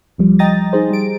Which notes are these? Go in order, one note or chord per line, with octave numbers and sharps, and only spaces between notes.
C2 F3 G3
D#5 G5 A#5 D#6 A6 A#6
D#4 G#4 C5
G3 D7